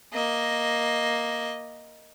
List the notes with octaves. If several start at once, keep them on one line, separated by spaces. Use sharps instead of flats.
A#3 D#5